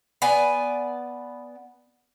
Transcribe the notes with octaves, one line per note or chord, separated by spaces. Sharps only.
B3 D5 G#5